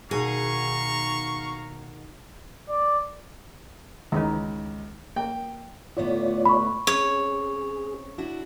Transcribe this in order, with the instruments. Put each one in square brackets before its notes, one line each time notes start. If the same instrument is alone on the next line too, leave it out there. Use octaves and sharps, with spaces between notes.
[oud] B2 D#3 [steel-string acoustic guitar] G#4 [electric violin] F5 A#5 [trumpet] C#6
[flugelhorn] D5
[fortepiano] C#2 [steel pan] D#3 E3 D#4
[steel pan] A#3 [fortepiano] G5
[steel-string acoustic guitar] D2 A2 B3 [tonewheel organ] F4 C#5 D5
[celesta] B5 C#6
[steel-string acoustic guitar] C4 C#4 [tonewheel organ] G#4 [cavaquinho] C#5
[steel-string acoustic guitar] D4 E4 F#4